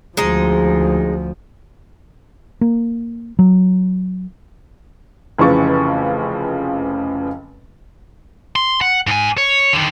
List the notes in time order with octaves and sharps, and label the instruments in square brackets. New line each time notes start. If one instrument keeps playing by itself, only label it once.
[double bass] D2 F3 [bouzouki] G#3 D#4
[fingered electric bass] A#3
F#3
[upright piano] F1 C#3 E3 F3 C#6 A6
[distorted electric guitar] C6
F#5
G#2 G#5
C#5
D3 D#3